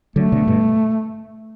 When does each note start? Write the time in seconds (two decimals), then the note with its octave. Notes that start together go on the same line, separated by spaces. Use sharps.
0.16 D3 F#3 A3
0.32 B2 D3
0.47 G2 B2